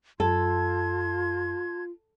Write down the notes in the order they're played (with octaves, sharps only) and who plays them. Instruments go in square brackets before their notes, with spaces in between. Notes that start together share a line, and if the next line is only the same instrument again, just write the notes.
[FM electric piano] F#2 [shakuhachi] F4 [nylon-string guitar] A4 [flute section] A5 C6 G#6